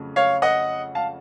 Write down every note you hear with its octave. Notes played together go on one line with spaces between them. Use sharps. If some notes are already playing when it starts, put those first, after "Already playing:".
Already playing: F2 C#3 F#3 A3
C#5 F5
D#5 F#5
F5 A5